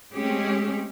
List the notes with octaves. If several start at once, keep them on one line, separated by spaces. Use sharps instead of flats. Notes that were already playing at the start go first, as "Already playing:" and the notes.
G#3 A3 C4 C#4 G4 G#4